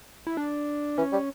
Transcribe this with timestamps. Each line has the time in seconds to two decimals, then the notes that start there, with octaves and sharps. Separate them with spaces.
0.27 E4
0.37 D4
0.98 E3 C#4
1.12 G3